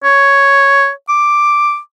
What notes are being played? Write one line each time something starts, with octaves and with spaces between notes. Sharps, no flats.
C#5
D6